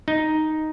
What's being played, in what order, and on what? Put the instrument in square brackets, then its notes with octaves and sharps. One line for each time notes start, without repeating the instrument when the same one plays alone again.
[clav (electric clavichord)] D#4